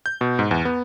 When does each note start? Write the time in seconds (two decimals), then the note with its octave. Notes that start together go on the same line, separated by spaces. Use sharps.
0.06 G6
0.21 B2
0.39 G#2
0.51 E2
0.65 B3